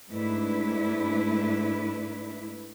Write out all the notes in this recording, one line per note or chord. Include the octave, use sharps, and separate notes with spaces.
G#2 A3 D4 E4 B4